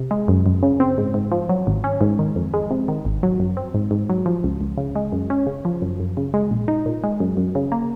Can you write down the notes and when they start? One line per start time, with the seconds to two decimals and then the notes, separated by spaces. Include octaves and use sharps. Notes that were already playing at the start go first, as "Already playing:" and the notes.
Already playing: C3
0.11 G#3
0.28 F#2
0.46 F#2
0.63 C#3
0.80 C4
0.98 G#2
1.14 G#2
1.32 F3
1.49 F#3
1.67 G#1
1.84 C#4
2.01 G#2
2.19 D#3
2.36 F2
2.54 G#3
2.71 C3
2.88 D#3
3.05 G#1
3.23 F#3
3.40 F#2
3.57 C4
3.74 G#2
3.91 G#2
4.09 F#3
4.26 F3
4.44 C#2
4.61 C#2
4.77 C#3
4.95 G#3
5.12 F#2
5.30 C#4
5.47 C#3
5.65 F3
5.82 F#2
6.00 F#2
6.17 C#3
6.34 G#3
6.51 A#1
6.68 D#4
6.86 A#2
7.04 G#3
7.20 F#2
7.37 F#2
7.55 C#3
7.72 A#3